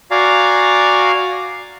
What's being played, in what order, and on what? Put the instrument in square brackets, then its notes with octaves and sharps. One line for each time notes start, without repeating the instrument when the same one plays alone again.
[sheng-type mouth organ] F#4 D5 F5 G#5 A#5